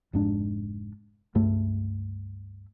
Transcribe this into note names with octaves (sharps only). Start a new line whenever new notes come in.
F1 G#2 D4
C#2 G2 A3